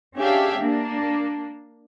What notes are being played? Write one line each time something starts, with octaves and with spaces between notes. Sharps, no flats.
C#4 D4 G4 G#4 E5 F5
A#3 D4